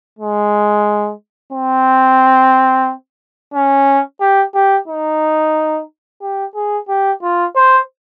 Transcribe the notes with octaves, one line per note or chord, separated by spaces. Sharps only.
G#3
C4
C#4
G4
G4
D#4
G4
G#4
G4
F4
C5